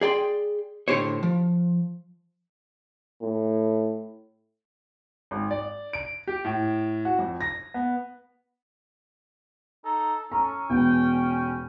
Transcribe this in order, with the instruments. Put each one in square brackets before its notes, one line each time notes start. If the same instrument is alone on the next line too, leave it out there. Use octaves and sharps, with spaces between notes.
[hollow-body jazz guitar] G#4 D5 G5 C6
A2 D3 G4 C5 C#5
F3
[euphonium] A2
[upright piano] G#1
D5
D7
G4
A2
F#4
F2
A#6
B3
[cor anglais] D#4 [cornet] A4
[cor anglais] C#4 [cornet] A4 [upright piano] A#5
[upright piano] E1 B3 [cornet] G5